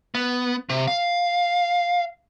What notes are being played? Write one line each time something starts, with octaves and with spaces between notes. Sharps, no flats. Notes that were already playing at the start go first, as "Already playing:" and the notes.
B3
C3
F5